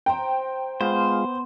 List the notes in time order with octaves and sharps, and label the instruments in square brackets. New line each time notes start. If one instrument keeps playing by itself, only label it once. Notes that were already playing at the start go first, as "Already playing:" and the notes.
[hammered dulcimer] C5 A#5 [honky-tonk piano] G5
[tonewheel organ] G#3 F4 [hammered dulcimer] B3 [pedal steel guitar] C5